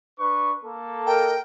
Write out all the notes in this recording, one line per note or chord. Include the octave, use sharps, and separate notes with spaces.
D4 B4 C#6
A#3 A4
A#4 D#5 G5 A#5